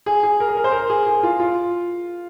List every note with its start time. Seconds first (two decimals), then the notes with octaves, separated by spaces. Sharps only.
0.06 G#4
0.23 G#4
0.40 A#4
0.49 G#4
0.57 A#4
0.64 C5
0.72 A#4
0.90 G#4
1.07 G#4
1.23 F4
1.40 F4